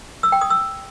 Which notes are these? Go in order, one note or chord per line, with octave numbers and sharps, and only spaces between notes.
E6
G5
D#6
E6